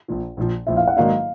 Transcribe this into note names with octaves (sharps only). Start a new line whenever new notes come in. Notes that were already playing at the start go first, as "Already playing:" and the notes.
A#1 A#2 F3
A#1 A#2 F3
A#1 A#2 F3 E5
F5
F#5
G#2 D#3 F#3 A#3 D4 F5